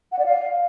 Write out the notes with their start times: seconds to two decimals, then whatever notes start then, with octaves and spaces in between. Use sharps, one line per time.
0.12 F#5
0.19 D5
0.26 F5